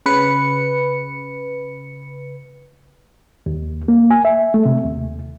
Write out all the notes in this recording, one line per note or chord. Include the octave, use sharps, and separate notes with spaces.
C#3 B4 C#7
D#2
A#3
G#5
E5
A3
C3
D#2